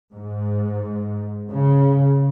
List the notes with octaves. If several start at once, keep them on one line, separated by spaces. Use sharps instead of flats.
G#2
C#3